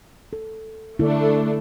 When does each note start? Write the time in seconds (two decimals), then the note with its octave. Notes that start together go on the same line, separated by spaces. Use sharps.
0.33 A4
0.99 D3 A3 D4 E4